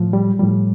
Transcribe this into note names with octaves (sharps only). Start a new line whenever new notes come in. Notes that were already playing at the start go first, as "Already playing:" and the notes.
Already playing: A2 F3
G3
A2 F3 G3